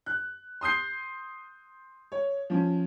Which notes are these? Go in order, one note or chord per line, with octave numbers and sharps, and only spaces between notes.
F#6
C6 D#6 G6 C7
C#5
F3 C#4